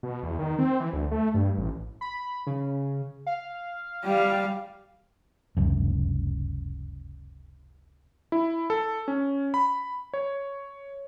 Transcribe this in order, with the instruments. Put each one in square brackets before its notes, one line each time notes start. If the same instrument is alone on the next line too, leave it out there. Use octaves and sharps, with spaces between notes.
[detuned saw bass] B2
E2
D#3
C4
E3
D2
A3
G2
A1
[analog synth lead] B5
C#3
F5
[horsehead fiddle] G3 F5
[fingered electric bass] F1 C#2 F#2
[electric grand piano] E4
A4
C#4
B5
C#5